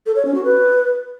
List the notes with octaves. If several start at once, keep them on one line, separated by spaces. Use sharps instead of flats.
A4
C#5
C#4
F#4
B4